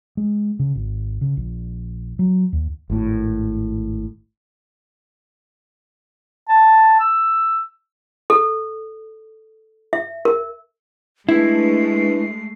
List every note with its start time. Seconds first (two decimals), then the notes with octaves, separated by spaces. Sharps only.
0.17 G#3
0.59 C#3
0.75 G#1
1.21 C#3
1.37 A#1
2.19 F#3
2.53 D#2
2.90 G#1 A2
6.49 A5
7.00 E6
8.30 A4
9.93 E5
10.25 A#4
11.29 G#3 A3 D4 E4 G#4 B4 C7